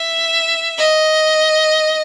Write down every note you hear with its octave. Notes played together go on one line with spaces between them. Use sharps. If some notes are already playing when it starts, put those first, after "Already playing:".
Already playing: E5
D#5